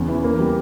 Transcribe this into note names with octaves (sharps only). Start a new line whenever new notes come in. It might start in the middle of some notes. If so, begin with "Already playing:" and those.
Already playing: E2 C#3
E3
A#3
G3